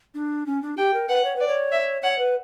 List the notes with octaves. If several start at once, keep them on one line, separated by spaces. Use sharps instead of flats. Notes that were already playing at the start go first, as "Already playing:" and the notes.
D4
C#4
D4
G4 G5
A#4
B4 F#5
C#5
B4 D5
C#5
E5
C#5 F#5
B4